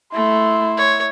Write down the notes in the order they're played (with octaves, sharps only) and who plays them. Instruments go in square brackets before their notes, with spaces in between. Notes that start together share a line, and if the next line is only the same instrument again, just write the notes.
[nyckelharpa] A3 [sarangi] E4 [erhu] C6
[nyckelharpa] C#5